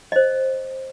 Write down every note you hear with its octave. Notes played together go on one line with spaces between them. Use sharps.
C5 D#5